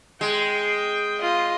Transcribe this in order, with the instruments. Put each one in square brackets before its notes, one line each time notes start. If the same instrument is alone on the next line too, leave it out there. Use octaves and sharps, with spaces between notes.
[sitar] G#3 [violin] G5
[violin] F4 D#5